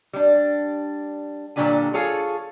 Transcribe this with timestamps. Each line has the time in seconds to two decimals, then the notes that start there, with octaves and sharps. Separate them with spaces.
0.13 G3 D4
1.56 A#2 D3 F#3 D4 G4 G#5
1.94 F4 G#4 A4 C#5